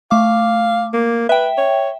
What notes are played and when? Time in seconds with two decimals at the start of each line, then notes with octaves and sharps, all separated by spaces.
0.11 A3 F5 D6
0.93 A#3
1.29 B4 E5 G5
1.58 C#5